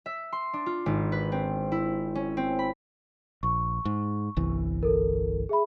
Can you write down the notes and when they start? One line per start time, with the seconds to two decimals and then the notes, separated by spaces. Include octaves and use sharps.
0.06 E5
0.33 C6
0.53 D4
0.66 F4
0.86 G#1
1.12 B4
1.32 C4
1.72 E4
2.15 C#4
2.37 C4
2.59 B5
3.43 A#1 C#6
3.85 G#2
4.37 G1 C2 E3
4.83 A4 A#4
5.49 G#4 E5 B5